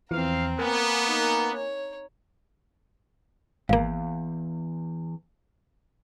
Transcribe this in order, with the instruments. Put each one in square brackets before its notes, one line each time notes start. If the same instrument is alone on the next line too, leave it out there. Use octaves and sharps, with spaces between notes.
[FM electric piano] E2 E3 F3 [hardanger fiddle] C4 A#5 [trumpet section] F5
[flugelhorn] A#3 [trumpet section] B3 [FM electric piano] A#4 G#5
[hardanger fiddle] D#4
C#5
[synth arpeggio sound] G#1 A#3 [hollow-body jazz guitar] E2 G2 [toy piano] F5